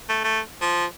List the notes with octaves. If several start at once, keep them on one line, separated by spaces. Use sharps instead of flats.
A3
A3
F3